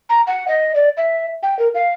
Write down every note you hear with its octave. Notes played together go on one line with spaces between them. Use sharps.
A#5
F#5
D#5
D5
E5
G5
A#4
F5